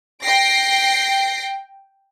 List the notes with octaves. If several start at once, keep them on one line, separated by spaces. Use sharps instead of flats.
G5 A#6 C7 D7